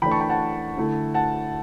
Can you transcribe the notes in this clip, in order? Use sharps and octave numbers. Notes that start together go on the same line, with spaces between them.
E3 A3 D4 G5 B5
A5 C#6
G5 B5
F#5 A5
D3 A3 E4
F#5 A5